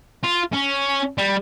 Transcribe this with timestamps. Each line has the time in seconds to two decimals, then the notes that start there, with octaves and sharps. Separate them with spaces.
0.24 F4
0.54 C#4
1.18 G3